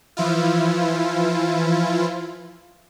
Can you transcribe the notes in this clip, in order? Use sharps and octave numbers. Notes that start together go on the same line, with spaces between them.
E3 F3 E4 F4